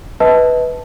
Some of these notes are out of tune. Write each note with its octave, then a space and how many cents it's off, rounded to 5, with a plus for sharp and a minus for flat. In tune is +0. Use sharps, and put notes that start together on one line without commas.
B4 +0 D#5 +45 A5 +0